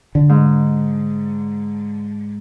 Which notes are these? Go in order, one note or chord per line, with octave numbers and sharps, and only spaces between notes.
D3
G#2